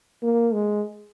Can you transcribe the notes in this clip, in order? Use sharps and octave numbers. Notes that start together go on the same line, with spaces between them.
A#3
G#3